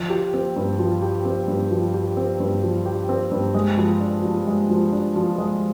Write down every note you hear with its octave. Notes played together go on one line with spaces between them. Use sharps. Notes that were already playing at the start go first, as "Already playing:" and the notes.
Already playing: F3
G4
C4
G2
F3
G4
C4
G2
F3
G4
C4
G2
F3
G4
C4
G2
G#3
F3
D4
F3
G#3
F3
D4
F3
G#3